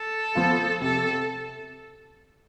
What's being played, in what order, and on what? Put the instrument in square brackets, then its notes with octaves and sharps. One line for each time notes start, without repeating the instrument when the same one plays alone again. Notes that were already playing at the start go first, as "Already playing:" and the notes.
Already playing: [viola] A4
[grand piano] F3 B3 F4
[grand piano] C3 [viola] A4